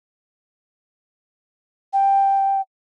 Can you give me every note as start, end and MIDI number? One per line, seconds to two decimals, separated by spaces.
1.93 2.61 79